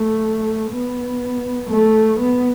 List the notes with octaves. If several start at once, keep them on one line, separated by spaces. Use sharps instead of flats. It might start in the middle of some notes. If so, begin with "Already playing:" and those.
Already playing: A3
B3
A3
B3